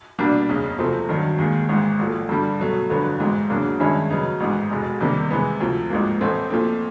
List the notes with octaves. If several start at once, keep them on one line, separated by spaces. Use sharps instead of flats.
C2 B2 G3 A#3 D4
F#1 E2 C#3
E2 C3 F3 A3 C4
G2 D#3 F#3
D#2 D#3 G#3
G#1 G#2 E3
A#1 A2 F3 A3
G2 D3 G3
B2 F#3 A3
G1 F2 D3 F#3 B3
A1 G#2 E3
E2 C#3 F#3 A#3 D4
G2 D#3 G#3 C#4 E4
C#3 F#3 B3 D#4
A1 G#2 E3
F1 E2 B2 G#3
E2 C3 D#3 G3 A#3
C3 E3 G#3 B3
D2 C3 F3
A1 G#2 F3 A#3
A1 A2 E3 A3 C4
A#2 F3 A3 C4